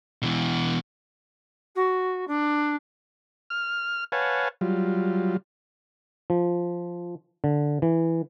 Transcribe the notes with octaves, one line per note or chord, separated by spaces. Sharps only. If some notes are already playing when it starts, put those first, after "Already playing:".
B2 E3
F#4
D4
F6
B4 C#5 F5 F#5 G#5 A5
F#3 G3 F4
F3
D3
E3